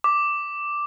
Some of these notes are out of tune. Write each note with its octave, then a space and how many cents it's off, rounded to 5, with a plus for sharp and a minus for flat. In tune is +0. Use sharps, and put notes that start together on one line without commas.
D6 +0